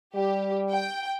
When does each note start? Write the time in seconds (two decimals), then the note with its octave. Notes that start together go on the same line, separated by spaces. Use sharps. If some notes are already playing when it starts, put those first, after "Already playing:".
0.15 G3 G4
0.71 G5